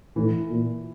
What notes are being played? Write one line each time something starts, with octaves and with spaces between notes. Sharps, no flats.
A2 E3
A#2